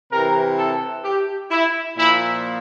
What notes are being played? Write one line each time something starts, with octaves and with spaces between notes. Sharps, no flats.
C3 E3 A#4
A4
G4
E4
A#2 F3 E4